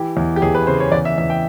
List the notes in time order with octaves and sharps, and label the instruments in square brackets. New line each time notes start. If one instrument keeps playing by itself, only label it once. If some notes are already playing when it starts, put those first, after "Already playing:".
Already playing: [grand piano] E3 G4
E2
G4
E2 G#4
B4
C#3 C5
C#5
E2 D5
E5
E2 E5
G5